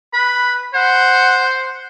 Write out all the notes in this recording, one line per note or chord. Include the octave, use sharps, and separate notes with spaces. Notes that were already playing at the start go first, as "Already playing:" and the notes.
B4 B5
C5 F#5